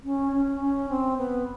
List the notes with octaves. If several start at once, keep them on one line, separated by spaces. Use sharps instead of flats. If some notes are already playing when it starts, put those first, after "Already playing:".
C#4
C#4
C#4
C4
B3